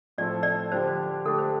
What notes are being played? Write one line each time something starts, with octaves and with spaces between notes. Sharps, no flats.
A2 F3 C4 A4 D5
D5
D3 F3 D4 G4 C5
D3 A3 D4 G4 A4
C5